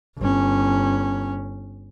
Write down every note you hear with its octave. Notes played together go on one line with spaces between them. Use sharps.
G1 C#4